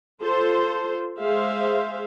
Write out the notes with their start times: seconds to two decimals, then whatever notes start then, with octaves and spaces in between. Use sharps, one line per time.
0.21 F4 A4 C5
1.18 G#3 G#4 C5 E5 F5